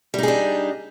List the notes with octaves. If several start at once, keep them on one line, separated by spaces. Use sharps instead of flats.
G3 D4 D#4 G#4